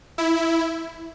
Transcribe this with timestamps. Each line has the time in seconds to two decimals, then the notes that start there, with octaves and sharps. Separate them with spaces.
0.18 E4